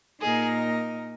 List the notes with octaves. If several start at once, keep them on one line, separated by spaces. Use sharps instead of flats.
A#2 A#3 D#4 G#4 A#4 D#5